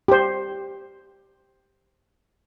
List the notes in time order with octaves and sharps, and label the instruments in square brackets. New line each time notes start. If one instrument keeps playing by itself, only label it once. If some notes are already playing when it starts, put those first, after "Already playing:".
[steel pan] G4 C5